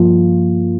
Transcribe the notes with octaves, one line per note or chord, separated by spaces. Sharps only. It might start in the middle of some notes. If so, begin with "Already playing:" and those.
Already playing: G2 F3 A#3 F4